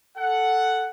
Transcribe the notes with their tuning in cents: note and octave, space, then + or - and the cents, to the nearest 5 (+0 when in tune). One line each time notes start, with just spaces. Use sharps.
A4 +0 F#5 +0